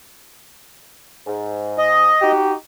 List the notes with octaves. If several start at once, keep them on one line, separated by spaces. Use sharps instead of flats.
G#2
D#5
D#4 F#4 G4